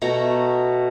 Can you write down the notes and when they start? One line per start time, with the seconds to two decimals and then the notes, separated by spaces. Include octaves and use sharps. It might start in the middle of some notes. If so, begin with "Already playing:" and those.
0.02 B2 A3 F#4 A#5